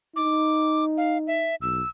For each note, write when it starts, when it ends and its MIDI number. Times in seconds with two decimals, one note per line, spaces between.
0.16 1.54 63
0.16 0.85 86
0.97 1.18 77
1.27 1.55 76
1.62 1.82 35
1.62 1.89 88